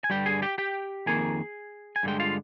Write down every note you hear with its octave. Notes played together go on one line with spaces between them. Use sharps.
G#5
G2 D3 G3 G4 G5
G#4 G#5
G4 G5
G4 G5
F2 D#3 A#3 G#4 G#5
G#5
G2 D3 G#3 G5
F4 F5